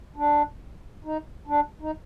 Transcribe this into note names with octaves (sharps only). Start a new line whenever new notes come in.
D4
D#4
D4
D#4